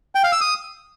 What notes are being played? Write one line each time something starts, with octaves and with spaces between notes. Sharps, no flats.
G5
F5
E6
D#6